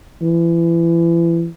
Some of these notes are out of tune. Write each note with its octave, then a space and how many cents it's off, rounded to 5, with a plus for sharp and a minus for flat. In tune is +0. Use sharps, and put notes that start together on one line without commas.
E3 +30